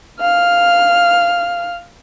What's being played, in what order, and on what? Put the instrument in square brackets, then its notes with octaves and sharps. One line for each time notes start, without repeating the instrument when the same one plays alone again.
[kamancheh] F5 F6